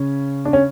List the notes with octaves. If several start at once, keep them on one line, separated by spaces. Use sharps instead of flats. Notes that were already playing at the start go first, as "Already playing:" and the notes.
Already playing: C#3 C#4
D4
C#4